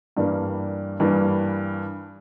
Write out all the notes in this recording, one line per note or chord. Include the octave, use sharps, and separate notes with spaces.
G2 E3 G3 A#3 D4
G2 E3 G3 A#3